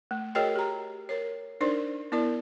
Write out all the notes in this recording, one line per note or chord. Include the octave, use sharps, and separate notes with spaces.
A3
F#4 G#4 A#4 C#5 D#5 G5
G4 A#5
A#4 C#5
D4 D#4 A#4 C5 D5
B3 E4 A#4 D5